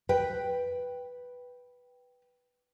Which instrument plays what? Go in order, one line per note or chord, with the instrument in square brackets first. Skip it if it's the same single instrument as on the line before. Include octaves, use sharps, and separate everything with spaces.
[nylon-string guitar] B4 G5